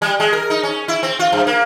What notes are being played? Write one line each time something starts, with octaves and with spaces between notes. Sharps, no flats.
G3
G#3
A#4
D#4
C#4
E4
C4
F4
G2
A#3